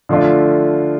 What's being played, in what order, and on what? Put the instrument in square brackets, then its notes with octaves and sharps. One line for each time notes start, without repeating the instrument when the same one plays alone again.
[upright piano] D3 F3 A3 D4 F4